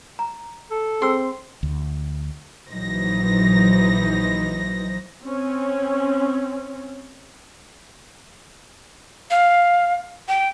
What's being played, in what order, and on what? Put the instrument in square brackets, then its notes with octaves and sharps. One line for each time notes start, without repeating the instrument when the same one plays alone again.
[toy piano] A#5
[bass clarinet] A4
[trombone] C4 [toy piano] G#4 E6 [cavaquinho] C6
[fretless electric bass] D2
[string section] A#1 E3 F#3 D#4 C5 A#6
[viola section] C4 C#4
[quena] F5
G5